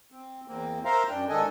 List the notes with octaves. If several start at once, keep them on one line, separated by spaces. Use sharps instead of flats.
C4
E2 A#3 C4
A#4 C5 E5 F5 A#5 C6
F#2 D4 G5
G#2 D#3 D4 A4 D#5 G#5